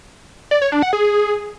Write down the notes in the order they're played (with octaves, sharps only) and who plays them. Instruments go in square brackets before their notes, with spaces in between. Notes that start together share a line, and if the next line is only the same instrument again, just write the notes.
[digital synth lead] D5
C#5
D4
F#5
G#4